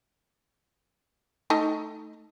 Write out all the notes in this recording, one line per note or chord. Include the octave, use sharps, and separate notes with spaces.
A3 D#4 A5